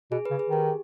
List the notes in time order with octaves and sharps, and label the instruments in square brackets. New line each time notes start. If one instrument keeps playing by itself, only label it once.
[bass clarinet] B2 [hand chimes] G#4
[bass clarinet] C#3 [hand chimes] B4
[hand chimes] G#4
[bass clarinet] D#3 [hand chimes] G4